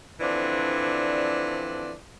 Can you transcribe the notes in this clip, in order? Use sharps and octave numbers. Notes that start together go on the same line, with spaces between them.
D3 E3 F3 C4 D4 D5